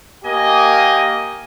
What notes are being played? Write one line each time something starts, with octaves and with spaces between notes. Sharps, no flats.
A#3 G4 D#5 G#5